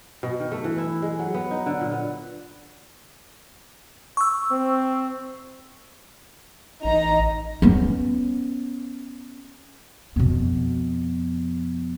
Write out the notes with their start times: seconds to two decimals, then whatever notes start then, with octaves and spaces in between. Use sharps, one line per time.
0.23 B2
0.40 D#3
0.52 A3
0.64 E3
0.78 E4
1.02 G#3
1.19 F#3
1.34 B3
1.51 D#4
1.66 D3
1.80 A#2
1.92 B3
4.17 C#6 E6
4.51 C4
6.84 A1 D#4 A#5
7.62 B3 C#4
10.16 F2 B2